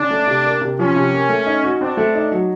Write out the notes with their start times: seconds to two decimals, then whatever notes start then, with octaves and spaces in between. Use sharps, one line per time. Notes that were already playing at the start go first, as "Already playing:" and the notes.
Already playing: C#3 D4
0.10 A3
0.27 C3
0.44 A#3
0.61 C3
0.79 F3 C#4
0.96 C3
1.13 A#3
1.29 A3
1.46 D#4
1.64 F#4
1.81 C4 D4
1.97 A3
2.15 D#4
2.32 F#3